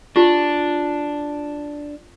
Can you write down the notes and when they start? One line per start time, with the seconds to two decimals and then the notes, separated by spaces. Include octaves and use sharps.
0.16 D4 F4 G4